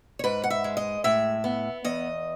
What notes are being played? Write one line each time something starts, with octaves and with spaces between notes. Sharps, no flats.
C#5
G#2 B4
F#5
E5
G#3
D#5
A2 E5
B3
E2 D#5